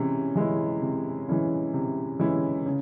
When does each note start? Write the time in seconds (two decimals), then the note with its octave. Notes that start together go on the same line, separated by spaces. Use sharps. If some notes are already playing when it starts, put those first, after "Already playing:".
Already playing: C3 E3 G#3 C#4
0.35 E3 G#3 C#4 E4
0.82 C3
1.28 E3 G#3 C#4 E4
1.74 C3
2.19 E3 G#3 C#4 E4
2.66 C#3